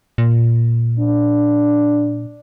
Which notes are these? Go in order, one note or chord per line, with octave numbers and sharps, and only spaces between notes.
A#2
D4